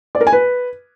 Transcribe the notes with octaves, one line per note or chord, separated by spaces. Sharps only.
D5
A#4
G#5
B4